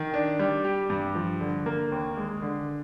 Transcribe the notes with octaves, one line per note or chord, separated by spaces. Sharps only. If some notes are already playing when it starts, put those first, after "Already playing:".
Already playing: D#3
D4
G3
G4
G2
F3
D3
A#3
D#2
G#3
D3